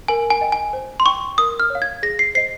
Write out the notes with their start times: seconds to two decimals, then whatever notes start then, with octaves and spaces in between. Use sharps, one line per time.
0.08 A#4 G#5
0.30 G#5
0.41 D#5 G5
0.52 G#5
0.73 C5
1.00 C6
1.06 G5 C#6
1.38 A#4 D#6
1.60 F6
1.70 C#5 F5
1.82 G#6
2.03 G#4 A#6
2.19 C7
2.35 C5 D#5 C7